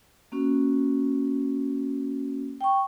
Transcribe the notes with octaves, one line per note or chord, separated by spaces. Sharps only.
A#3 C#4 F#4
G5 C#6